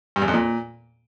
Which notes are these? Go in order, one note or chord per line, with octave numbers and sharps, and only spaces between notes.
G2
E2
F2
A#2